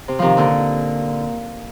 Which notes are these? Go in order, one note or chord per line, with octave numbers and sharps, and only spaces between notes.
C3
C3 D#3 F3
A#2 D3